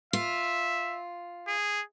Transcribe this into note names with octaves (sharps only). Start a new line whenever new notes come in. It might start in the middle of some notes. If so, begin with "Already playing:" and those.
F4 E5
G#4